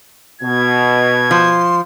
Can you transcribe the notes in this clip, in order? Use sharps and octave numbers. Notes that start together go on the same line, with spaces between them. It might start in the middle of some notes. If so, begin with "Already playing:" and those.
B2 G#6
F3 C6